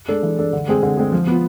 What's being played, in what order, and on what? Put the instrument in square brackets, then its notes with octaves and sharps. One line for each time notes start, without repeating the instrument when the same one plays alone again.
[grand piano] G#3 D4 A4
E3
G#3 D4 A4
D3
G#3 C4 G#4
D3
G#3 C4 G#4
F3
B3 F4